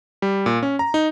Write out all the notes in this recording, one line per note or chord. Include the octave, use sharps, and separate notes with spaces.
G3
A#2
C#4
A#5
D#4